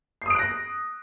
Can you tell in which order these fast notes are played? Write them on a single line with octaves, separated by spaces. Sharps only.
C7 D#6 D7 F#6 A#6